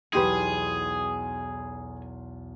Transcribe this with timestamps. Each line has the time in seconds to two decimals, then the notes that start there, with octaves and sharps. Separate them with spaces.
0.13 B1 E2 D#4 G4 G#4 B4 C6